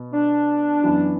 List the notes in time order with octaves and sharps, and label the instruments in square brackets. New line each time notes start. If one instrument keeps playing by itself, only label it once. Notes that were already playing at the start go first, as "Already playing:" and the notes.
Already playing: [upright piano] B2 B3
[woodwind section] D4
[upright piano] F#2 E3 B3 E4